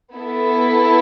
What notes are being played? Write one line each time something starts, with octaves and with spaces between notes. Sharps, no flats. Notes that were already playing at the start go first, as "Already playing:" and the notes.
B3 E4 A4